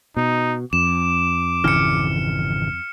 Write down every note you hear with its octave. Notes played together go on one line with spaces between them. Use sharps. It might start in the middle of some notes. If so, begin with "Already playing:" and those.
B2 D#4
F2 D6 E7
G#1 C#3 E3 F6 C#7